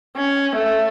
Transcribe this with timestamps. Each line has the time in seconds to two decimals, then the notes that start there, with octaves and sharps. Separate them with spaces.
0.17 C#4
0.56 A3